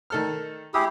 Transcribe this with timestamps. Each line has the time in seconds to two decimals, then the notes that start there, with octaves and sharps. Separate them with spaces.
0.10 D#3 A4 F6
0.74 E4 G4 G#4 D#6 E6